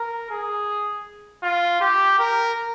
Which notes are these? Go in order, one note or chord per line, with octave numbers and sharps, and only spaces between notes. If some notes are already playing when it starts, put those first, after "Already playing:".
Already playing: A#4
G#4
F4
G4
A#4